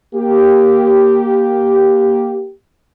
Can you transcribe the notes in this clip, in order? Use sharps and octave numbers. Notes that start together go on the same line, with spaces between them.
A#3 G4